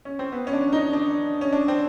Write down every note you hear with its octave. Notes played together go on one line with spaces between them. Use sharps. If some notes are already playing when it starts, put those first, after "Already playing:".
C#4
C4
B3
C#4
D4
D#4
D4
C#4
D4
C4